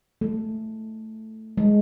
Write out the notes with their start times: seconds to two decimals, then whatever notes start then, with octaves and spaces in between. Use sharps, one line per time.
0.21 A3
1.58 G#3